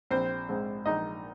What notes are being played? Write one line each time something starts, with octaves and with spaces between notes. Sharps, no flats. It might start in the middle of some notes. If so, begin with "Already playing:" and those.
A#1 C4 C5
G#2 G#3 C4
A#1 D#4 D#5